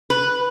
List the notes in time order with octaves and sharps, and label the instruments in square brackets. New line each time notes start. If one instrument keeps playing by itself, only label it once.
[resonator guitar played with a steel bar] B4